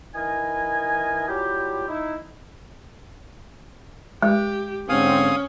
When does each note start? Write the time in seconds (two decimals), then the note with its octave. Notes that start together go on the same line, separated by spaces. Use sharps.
0.15 E3 D#4 E4 A#4 D#5 G#5
1.28 F#3 G3 E4 F4 G4
1.88 D#4 E4
4.23 G#3 G4
4.89 G#2 D3 C4 C#4 F5 G#5 D#6